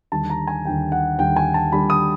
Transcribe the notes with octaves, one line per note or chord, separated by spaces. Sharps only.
D#2 D3 G3 A5
A#5
G#5
D#2 D3 G3 G5
F#5
D#2 D3 G3 G5
G#5
A5
D#2 D3 G3 B5
D#6